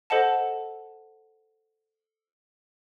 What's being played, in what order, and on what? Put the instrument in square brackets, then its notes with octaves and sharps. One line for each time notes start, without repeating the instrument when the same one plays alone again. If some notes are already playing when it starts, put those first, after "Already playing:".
[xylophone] A4 C5 D#5 F#5 A5